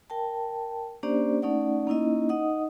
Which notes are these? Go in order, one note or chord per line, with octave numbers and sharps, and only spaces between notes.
A#4 G5 A5
A#3 C#4 D4 G4 C5 D5
A3 C#4 D#4 D5 F#5
A#3 C#4 D#4 E4 D#5
D#4 D#5 F#5 D#6